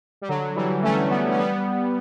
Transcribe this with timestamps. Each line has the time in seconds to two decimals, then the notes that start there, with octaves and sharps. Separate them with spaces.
0.22 G3
0.28 D3 F#3
0.55 E3 G3
0.83 A3 C#4
1.10 G3 B3
1.31 C#4
1.38 G3 B3